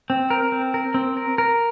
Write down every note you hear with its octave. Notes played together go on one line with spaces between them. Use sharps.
C4
A#4
C4
A#4
C4
A#4
A#4